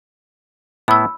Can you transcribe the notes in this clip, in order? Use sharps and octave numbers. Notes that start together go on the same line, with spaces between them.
A2 B3 E4 B5 E6